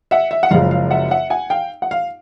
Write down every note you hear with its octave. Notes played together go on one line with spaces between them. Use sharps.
E5 F#5
E5
F#5
F#1 F#2 C#3 F3 G#3 F5
F5
E5 F#5
E5 F#5
F#5 G#5
F5 G5
F#5
F5